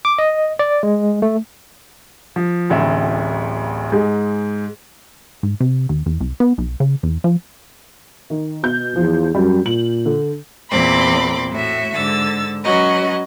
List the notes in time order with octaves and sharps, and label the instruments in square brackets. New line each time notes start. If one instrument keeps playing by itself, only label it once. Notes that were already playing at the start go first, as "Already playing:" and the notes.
[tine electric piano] D6
D#5
D5
G#3
A3
[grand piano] F3
D1 A1 D2 E5
G#2 G#3
[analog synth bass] G#2
C3
D#2
E2
C2
B3
B1
C#3
E2
F3
[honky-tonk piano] D#3
B2 G6
[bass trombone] E2 [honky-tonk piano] F3
[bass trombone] F#2 [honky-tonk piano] G3
[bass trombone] A#2 [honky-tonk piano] F#7
[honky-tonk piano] D3
[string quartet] E2 A#2 C4 B5 C6 D6
A2 F#4 E5
G#2 D3 E6 A6
F#3 C#4 F#4 B4 D#5